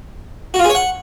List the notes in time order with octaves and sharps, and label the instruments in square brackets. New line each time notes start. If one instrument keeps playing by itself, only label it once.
[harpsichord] F#4
F4
G#4
C#5
F#5